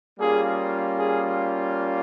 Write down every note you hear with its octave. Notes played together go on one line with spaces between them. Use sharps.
G3 A#3 C#4 F4 G#4
G#4